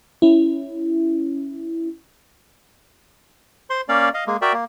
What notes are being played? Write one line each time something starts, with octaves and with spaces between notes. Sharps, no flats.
C#4 E4
C5 C6
A#3 C#4 D5 F5
D#5 F5
G#3 A#3
F#4 A#4 D5 E5 G5
A#3